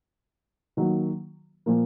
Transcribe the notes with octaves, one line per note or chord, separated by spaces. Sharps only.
D#3 F#3 A#3
A#2 F3 A#3